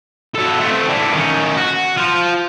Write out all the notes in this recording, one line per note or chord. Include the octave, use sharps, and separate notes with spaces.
F#3 A4
A3 C4
E3 D4
D#3 C#4
F#4
F4 C5